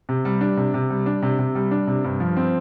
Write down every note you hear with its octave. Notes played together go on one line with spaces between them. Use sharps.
C3
G3
D4
C3
C3
G3
D4
C3
C3
G3
D4
C3
G2
F3
C4